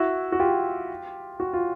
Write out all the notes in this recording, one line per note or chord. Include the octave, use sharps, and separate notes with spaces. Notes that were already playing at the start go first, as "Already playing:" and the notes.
Already playing: E4 F#4
F#4
F4 G4
F#4
F4